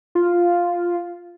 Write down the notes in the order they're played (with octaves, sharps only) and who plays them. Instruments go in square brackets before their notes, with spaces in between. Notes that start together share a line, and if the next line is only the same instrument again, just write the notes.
[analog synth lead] F4